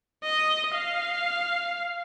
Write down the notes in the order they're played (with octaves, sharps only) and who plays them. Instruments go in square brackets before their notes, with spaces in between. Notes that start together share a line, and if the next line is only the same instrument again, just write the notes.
[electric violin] D#5
F5